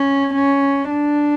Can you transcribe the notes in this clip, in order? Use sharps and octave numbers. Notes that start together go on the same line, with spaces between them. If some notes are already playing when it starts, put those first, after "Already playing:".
Already playing: C#4
C#4
D4